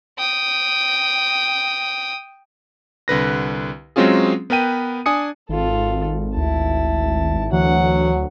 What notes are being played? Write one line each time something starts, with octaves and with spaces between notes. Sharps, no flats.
G5 D#6
C2 D3 B4 A#6
F#3 G#3 C4 C#4 F4 G#4
B3 A#4 B4 G5 D#7
D4 G#5 D#6 C#7
G#1 F4 A4
D2 E4 A5
D2 E3 F#3 F#5